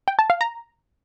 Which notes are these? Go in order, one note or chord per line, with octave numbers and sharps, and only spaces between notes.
G5
A5
F5
A#5